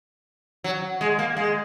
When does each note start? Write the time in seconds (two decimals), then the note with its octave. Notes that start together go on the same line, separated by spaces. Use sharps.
0.64 F#3
1.01 G#3
1.19 A#3
1.37 G#3